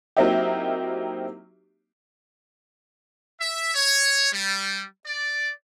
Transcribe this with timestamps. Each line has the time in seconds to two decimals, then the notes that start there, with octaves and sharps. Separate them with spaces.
0.17 F#3 A#3 C4 D#4 E4 G4
3.40 E5
3.74 C#5
4.32 G3
5.05 D5